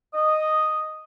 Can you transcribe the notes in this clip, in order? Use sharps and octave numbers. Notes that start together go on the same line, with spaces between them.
D#5